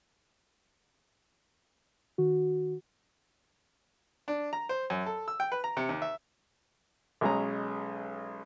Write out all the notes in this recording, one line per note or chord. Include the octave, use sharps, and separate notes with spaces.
D#3 F#4
D4
A#5
C5
F#2
A4
E6
G5
B4
A#5
C3
D#2
E5
B1 G#3 C#4 A#5